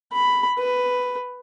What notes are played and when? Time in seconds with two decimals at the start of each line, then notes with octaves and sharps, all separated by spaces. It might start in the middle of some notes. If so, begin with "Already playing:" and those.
0.13 B5
0.58 B4